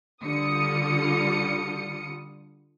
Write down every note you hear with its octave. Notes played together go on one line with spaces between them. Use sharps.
D3 G3 F4 D#6 C#7